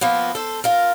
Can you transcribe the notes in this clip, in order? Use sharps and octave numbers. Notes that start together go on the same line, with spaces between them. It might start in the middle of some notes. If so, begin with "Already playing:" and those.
F3 A#3 B3
A4 C5
F4 A#4